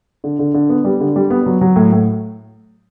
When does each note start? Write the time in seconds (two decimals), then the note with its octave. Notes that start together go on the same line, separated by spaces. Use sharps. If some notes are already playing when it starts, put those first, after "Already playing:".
0.24 D3
0.39 D3
0.54 D3
0.69 B3
0.84 G3
1.00 D3
1.16 G3
1.30 B3
1.46 F#3
1.61 F#3
1.76 A2
1.92 A2